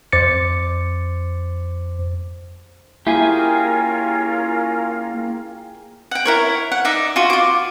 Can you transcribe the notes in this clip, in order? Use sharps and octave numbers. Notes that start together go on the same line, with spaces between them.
F2 C5 D6 A6 C#7
A#3 C#4 E4 F4 G4 G#4 A#4 G#5
F#5 G5
E4 A#4 C#5
F#5
D#4 D5 E5
F4 F#4
F4 D6